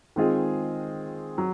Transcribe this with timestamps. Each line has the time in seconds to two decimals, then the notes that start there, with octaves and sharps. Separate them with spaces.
0.16 D#3 G#3 C4 F4 G#4
1.38 F#3